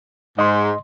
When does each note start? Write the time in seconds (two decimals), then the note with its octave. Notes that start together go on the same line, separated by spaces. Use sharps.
0.39 G#2 D#5 C6